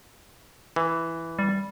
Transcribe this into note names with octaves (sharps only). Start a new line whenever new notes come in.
E3
G3